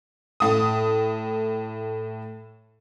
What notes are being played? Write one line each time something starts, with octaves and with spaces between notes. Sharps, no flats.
A2 D#6